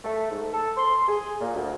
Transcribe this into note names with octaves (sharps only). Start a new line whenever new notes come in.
A3
G#2
A4
C6
G#4
A#2
D2